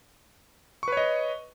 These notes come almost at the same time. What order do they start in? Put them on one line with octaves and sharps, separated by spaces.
C#6 B4 C#5 D#5